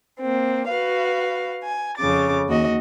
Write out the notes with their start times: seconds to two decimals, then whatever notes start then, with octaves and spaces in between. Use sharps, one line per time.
0.20 A#3 C4
0.68 F#4 B4 F5
1.63 G#5
1.97 F2 C#3 D6 A6
2.49 D#2 F#4 D#5